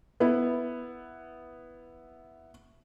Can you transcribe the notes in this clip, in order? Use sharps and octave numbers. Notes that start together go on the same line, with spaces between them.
B3 E4